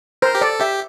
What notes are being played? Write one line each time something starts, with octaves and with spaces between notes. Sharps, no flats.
A#4 C5
G4
A4 D5
G4 E5